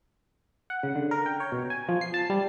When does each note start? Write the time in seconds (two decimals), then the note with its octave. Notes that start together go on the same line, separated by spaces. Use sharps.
0.70 F#5
0.83 C#3
0.96 D3
1.11 A#4
1.26 G5
1.40 C#5
1.52 B2
1.70 G#5
1.89 F3
2.01 C7
2.14 A5
2.30 G3